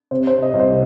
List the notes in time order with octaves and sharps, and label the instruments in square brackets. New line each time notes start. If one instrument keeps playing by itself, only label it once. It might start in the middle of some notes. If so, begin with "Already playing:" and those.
[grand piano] C3 C5
C5
C3
D#5
C2
C5